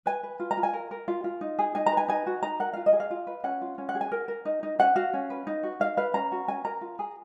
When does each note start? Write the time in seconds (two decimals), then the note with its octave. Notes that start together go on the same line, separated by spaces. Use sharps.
0.06 B4 G#5
0.23 B4
0.40 F4
0.51 A#5
0.57 F4
0.63 G#5
0.73 A#4
0.91 A#4
1.08 F4
1.24 F4
1.41 D#4
1.59 G#4
1.75 D#4 G#5
1.86 A#5
1.92 B4
1.97 G#5
2.08 D#4 G#5
2.26 F#4
2.43 D#4 A#5
2.60 A#4 F#5
2.73 F4 F5
2.86 D#5
2.93 G#4
3.00 F5
3.10 F4
3.27 B4
3.44 C#4 F#5
3.61 F4
3.78 C#4
3.89 F#5
3.95 G#4
4.01 G#5
4.12 A#4
4.28 A#4
4.45 D#4
4.63 D#4
4.79 C#4 F#5
4.96 F#4 F5
5.14 C#4
5.30 B4
5.47 D#4
5.63 F#4
5.80 D#4 F5
5.97 B4 F5
6.14 C#4 A#5
6.32 F#4
6.48 C#4 G#5
6.65 A#4 A#5
6.81 F4
6.99 G#4